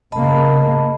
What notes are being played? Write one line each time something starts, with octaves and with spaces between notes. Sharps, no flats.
C#3 A#3 D#5 A5 B5